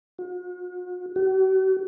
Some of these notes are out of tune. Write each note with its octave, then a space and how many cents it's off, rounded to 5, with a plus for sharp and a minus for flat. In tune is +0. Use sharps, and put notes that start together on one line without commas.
F#4 -45
F#4 +45